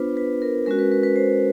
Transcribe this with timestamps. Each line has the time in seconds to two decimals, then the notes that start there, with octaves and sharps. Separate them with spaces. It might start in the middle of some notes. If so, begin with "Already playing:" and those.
Already playing: B3 D4 F4 B4 C5
0.17 B4
0.42 A#4
0.66 G#3 C#4 F#4 A#4
0.79 B4
0.92 B4
1.03 B4
1.16 C5